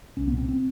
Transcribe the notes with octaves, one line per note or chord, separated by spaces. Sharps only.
C2 C#4
B3
A#2
C4
C4